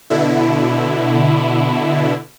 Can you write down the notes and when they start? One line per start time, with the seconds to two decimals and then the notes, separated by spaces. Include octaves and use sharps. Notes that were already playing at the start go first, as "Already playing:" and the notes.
0.10 B2 D3 E4